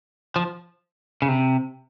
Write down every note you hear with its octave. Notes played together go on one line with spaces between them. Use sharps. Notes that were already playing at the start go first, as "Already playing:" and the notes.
F3
C#3
C3